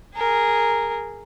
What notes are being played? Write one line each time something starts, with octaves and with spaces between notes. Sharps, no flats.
G#4 A#4